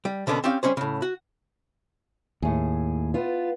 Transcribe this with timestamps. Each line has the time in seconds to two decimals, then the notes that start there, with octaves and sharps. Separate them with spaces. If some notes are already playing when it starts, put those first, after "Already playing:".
0.05 G3
0.27 B2 D3 A#3 B3 C#4
0.44 C4 C#4 G4 D5 F5
0.63 G3 C4 C#4 G#4 C5
0.77 A2 C#3
1.02 F#4
2.42 D#2 A2 G#4
3.14 B3 F4